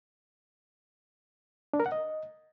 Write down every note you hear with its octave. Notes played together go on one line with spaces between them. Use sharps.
D4
A#4
F#5
D#5